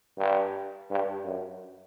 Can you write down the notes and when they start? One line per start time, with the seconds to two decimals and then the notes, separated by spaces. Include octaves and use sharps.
0.18 G2
0.90 G2
1.25 F#2